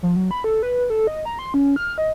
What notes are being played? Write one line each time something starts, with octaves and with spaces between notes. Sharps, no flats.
F3
F#3
B5
A4
B4
A4
D#5
A#5
C6
C#4
F6
D#5